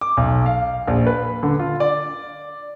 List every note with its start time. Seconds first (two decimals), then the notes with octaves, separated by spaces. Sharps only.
0.01 D6
0.17 B1
0.46 F5
0.88 A#1
1.07 B4
1.43 D3
1.59 F4
1.80 D5